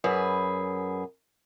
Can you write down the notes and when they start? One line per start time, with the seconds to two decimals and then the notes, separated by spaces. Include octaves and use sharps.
0.04 F#2 G#4 B4